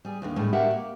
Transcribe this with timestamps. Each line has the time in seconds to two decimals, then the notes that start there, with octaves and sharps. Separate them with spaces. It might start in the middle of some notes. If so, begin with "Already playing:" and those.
0.05 G3 G#4
0.22 D#2 D3 D#3
0.36 A2 G3 G#3 D#4 E4
0.53 F#4 G4 A#4 E5 F#5
0.71 A#3